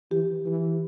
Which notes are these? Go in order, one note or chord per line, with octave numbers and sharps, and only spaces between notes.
E3 G4
E3